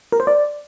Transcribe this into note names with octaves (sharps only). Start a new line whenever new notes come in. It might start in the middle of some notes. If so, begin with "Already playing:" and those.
A#4
C5
D5